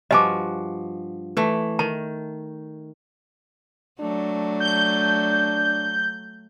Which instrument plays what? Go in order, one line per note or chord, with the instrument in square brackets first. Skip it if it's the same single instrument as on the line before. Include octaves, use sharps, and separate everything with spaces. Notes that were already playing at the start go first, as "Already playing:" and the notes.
[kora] G2 F3 F#4 [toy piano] D#5 G#5 D6
[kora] E3 A3
[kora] D#3 [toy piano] A5
[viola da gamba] F#3 A3 [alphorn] D4
[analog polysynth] G6